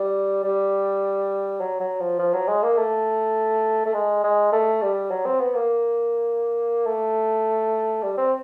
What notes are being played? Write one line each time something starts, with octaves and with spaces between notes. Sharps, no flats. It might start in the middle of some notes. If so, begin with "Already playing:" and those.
Already playing: G3
G3
F#3
F#3
F3
F3
F#3
G#3
A#3
A3
A3
G#3
G#3
A3
G3
F#3
C4
B3
A#3
A3
G3
C4